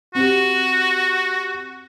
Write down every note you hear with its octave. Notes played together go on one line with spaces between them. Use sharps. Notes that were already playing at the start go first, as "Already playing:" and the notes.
C4 F#4 G4